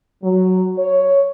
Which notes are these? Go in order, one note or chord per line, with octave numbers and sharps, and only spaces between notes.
F#3
C#5